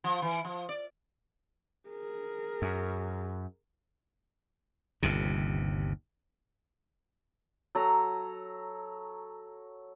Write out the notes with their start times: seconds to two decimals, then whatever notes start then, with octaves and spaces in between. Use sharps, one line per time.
0.04 F3
0.22 E3
0.45 F3
0.69 D5
1.88 G#4 A#4
2.62 F#2
5.03 G1 D#2 C3
7.75 F#3 A4 A#5